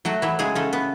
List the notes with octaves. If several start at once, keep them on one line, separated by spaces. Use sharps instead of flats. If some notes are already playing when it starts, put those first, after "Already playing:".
F#3 A3 F#4
E3 F#3 E4
C#3 G#3 G#4
C#3 A3 A4
B3